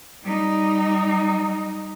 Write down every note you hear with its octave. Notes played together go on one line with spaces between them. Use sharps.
G3 D#4